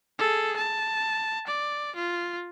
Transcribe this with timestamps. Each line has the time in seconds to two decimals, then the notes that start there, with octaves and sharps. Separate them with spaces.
0.19 G#4 A4
0.57 A5
1.47 D5
1.96 F4